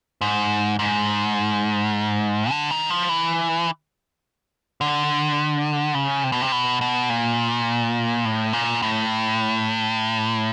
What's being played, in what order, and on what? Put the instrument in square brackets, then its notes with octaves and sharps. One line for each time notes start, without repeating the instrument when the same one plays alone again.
[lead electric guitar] G#2
G#2
D3
D#3
F3
E3
D3
C#3
C3
B2
C3
B2
B2
A#2
A2
A#2
A2